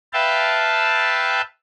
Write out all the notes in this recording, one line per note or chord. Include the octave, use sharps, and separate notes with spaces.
B4 E5 F5 G5 A5